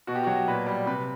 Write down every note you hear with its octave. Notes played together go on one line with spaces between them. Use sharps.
B2 F#4
G4
F#3 F#4
A#2 B4
G3
C3 B4